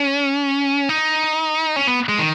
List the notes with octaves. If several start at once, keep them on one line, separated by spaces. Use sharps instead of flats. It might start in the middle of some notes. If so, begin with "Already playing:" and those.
Already playing: C#4
D#4
C#4
B3
G#3
D#3